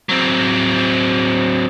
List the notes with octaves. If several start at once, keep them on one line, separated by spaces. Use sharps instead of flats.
F#3 C4